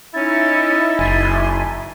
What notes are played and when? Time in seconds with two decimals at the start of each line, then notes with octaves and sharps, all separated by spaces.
0.14 C#4 D#4 E4 A6
0.99 F#1 E5 G#5 C6